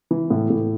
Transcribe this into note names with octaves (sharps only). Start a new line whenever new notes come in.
E3
A2
A2